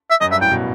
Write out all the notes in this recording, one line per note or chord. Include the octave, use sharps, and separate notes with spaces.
E5
F#2 D#5
G2 E5
A2 G5
B2